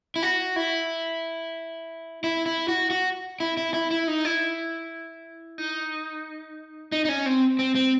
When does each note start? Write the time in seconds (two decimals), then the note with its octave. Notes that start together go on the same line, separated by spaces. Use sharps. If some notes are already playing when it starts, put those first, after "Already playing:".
0.16 E4
0.23 F#4
0.56 E4
2.24 E4
2.46 E4
2.68 F#4
2.91 F#4
3.40 E4
3.57 E4
3.74 E4
3.91 E4
4.08 D#4
4.25 E4
5.58 D#4
6.92 D#4
7.05 D#4
7.09 C#4
7.26 C4
7.59 C4
7.75 C4